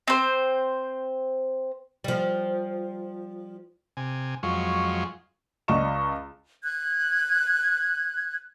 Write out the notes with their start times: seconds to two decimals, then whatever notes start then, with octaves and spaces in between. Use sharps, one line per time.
0.08 C4 C5
2.04 F3 G3
3.97 C3 G#5
4.43 F2 F#3 G#3 F4 C#6
5.68 C#2 D5 D#5 C#6 E7
6.63 F#6 G#6